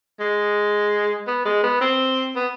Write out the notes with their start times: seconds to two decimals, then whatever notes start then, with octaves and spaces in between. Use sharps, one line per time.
0.20 G#3
1.27 B3
1.45 G#3
1.63 B3
1.81 C4
2.36 B3